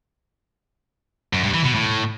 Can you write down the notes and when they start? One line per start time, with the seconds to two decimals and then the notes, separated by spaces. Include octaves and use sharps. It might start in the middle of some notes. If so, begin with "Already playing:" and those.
1.33 F#2
1.43 G2
1.54 E3
1.64 B2
1.75 A2